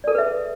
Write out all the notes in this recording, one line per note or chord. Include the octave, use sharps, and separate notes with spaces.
G#4 A4 B4 D5 E5